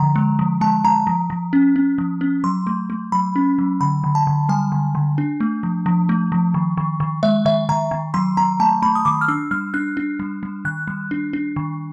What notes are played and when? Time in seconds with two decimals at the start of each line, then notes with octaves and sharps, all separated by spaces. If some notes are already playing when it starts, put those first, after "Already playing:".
Already playing: D3 F3 A#5
0.16 G#3
0.39 F3
0.61 G#3 A5
0.84 G#3 A#5
1.07 F3
1.30 F3
1.53 C#4
1.76 C#4
1.98 F3
2.21 C#4
2.44 F#3 C6
2.67 A3
2.90 A3
3.12 F#3 B5
3.36 C#4
3.58 F#3
3.81 D3 B5
4.04 D3
4.15 A5
4.27 D3
4.49 G3 G#5
4.72 D3
4.95 D3
5.18 D4
5.40 A3
5.63 F3
5.86 F3
6.09 A3
6.32 F3
6.54 D#3
6.77 D#3
7.00 D#3
7.23 G#3 E5
7.45 D#3 E5
7.69 D#3 A#5
7.91 D#3
8.14 F#3 C6
8.37 F#3 A#5
8.60 A3 A5
8.82 A3 B5
8.95 D#6
9.05 D#3 D6
9.21 F6
9.28 D4 E6
9.51 G3 F6
9.74 D4 F#6
9.97 D4
10.20 G3
10.43 G3
10.65 D#3 F#6
10.87 G3
11.11 D4
11.33 D4
11.56 D#3